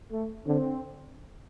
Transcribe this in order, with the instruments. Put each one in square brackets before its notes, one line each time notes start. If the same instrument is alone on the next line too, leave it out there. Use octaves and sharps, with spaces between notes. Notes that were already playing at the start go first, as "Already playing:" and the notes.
[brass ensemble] A3
[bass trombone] D3 [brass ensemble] C4